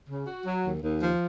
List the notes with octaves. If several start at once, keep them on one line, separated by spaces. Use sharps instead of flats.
C#3
F#4
F#3
D#2
D#2
F3